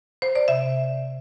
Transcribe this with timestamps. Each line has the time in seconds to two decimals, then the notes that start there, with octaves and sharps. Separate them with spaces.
0.22 C5
0.36 D5
0.48 C3 E5